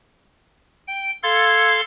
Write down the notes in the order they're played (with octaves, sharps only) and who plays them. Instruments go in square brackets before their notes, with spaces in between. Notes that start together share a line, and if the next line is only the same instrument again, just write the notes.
[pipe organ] G5
A4 F5 C6 G#6 A6